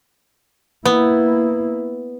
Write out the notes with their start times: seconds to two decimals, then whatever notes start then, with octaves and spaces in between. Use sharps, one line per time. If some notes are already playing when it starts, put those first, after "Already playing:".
0.85 A#3 B3 E4